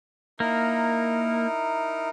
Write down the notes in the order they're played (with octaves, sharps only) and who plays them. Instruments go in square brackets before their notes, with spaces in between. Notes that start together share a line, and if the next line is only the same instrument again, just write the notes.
[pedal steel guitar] A#3 [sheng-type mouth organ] D#4 E4 A#4